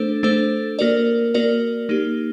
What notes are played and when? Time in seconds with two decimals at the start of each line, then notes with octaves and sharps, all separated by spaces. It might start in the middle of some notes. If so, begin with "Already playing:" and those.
Already playing: A3 D4 A4 C5
0.23 A3 D4 A4 C5
0.79 A#3 F#4 A#4 D5
1.34 A#3 F#4 A#4 D5
1.89 A#3 D#4 G4